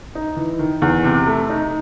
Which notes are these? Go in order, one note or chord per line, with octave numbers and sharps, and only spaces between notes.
D#4
E3
D#3
E2
C3
A3
D#4